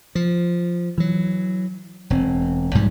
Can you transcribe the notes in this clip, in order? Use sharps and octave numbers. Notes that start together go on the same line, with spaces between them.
F3
E3 F#3
E1 C4
B1 G#2 F3 G3